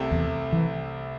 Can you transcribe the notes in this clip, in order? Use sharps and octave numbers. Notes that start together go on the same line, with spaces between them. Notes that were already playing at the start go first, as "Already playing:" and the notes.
Already playing: C2 C3 A3 E4 G4
E2
E3